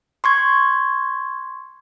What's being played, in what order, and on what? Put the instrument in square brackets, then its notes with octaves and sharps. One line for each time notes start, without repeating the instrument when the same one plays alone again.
[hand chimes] C6 C#6 G#6